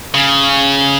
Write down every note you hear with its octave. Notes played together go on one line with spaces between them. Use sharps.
C#3